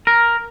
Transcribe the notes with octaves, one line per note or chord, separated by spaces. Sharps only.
A#4